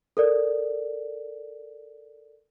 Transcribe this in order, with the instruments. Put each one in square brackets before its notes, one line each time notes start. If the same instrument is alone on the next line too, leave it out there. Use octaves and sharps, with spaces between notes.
[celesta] A4 A#4 D5